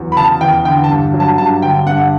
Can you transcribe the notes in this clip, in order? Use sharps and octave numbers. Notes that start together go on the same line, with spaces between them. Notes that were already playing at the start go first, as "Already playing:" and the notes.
Already playing: E2 F#3
B5
C#3 A5
E2 G5
D3 G5
A5
G2
F#3
A5
G2 A5
D3 G5
G2 F#5